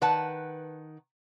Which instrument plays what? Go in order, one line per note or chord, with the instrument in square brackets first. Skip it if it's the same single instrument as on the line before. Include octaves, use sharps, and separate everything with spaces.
[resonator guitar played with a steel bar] D#3 B4 F#5 A5